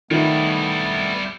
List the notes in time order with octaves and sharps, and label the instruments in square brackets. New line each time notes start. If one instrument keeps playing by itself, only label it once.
[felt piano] D#3 [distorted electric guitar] G3 E4 [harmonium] A3 B3